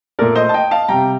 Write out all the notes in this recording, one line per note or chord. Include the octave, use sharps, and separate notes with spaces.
A#2 A3 A#4 D5
C5 D#5
A5
D#5 G5
F5 A5
C3 G3 G5 A#5